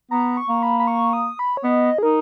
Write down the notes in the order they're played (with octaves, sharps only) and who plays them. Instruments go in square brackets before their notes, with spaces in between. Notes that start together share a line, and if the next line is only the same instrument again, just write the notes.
[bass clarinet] B3 [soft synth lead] A#5
[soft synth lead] C#6
[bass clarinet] A#3
[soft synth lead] B5
B5
C#6
D#6
B5
C#5
[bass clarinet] B3 [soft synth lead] D#5
[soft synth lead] G#4
[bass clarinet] D#4 [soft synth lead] A#4